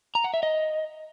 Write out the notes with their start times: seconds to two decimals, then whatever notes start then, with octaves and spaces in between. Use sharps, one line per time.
0.15 A#5
0.24 F#5
0.34 E5
0.43 D#5